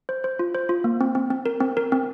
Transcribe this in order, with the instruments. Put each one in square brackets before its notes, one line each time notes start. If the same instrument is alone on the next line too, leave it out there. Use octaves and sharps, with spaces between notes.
[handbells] C5
C5
F4
C5
F4
A#3
C4
C4
C4
A#4
C4
A#4
C4